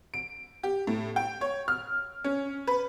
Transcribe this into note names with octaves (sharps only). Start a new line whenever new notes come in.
D7
G4
A2
G5
C#5
F6
C#4
B4